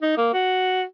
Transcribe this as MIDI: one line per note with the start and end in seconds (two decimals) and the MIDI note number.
0.02 0.13 63
0.17 0.29 58
0.34 0.83 66